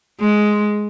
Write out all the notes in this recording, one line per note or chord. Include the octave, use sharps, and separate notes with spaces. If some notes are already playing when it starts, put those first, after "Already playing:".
G#3